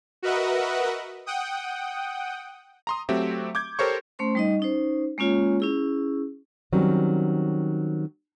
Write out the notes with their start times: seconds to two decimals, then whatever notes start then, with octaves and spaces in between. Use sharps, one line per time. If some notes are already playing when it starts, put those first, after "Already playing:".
0.22 F#4 A#4 B4 D#5 E5 F#5
1.26 F#5 G5 D#6
2.87 A#5 C6 D#6
3.09 F#3 A3 C4 F#4 G4 E5
3.55 D6 G6 G#6
3.79 G4 A4 A#4 C5 C#5 C#6
4.19 A3 C#4 C5 C6
4.35 G3 D#4 D#5
4.60 C#4 D#4 C5
5.18 G#3 A#3 C#4 F4 C#5
5.60 C#4 E4 G#4
6.72 D#3 F#3 G3 C4 C#4